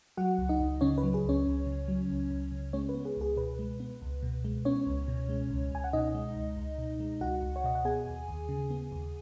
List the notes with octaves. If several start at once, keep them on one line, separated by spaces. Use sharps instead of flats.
F#3 F#4 F#5
C#2
D#4 D#5
C#2
C#3 C#4 C#5
B4
F#3
G#4
C#2 C#4 C#5
C#2
C#3
F#3
C#2
C#2
C#3
G#3 C#4 C#5
B4
B3
G#4
C#2 G#4
B2 B4
G#3
B3
C#2
B2
G#3
B3 C#4 C#5
C#2
B2
G#3
C#2
C#2 G#5
F#5
B2 D#4 D#5
G#3
C#2
C#2
B2
G#3
C#2 F#4 F#5
C#2
C#5
B2 D#5
F#5
B3 G#4 G#5
D#2
D#2
C#3
B3
D#2